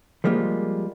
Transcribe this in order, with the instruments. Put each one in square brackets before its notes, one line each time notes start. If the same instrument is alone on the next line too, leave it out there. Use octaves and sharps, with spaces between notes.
[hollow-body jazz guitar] F3 G3 G#3 A#3 F4